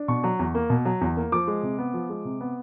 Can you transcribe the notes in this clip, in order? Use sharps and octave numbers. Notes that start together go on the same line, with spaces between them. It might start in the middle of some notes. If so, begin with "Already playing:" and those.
Already playing: D4
B2 C#6
F#3
E2
A#3
B2
F#3
E2
A#3
F3 D6
G#3
C3
B3
F3
G#3
C3
B3